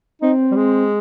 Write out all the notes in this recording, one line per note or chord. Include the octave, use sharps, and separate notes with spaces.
C4 D#4
G3
G#3